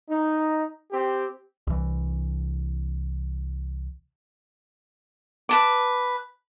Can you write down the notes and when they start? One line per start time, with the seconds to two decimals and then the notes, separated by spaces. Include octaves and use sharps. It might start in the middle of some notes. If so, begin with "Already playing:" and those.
0.10 D#4
0.92 C4 G4
1.67 C2 E3
5.49 B4 A5 D6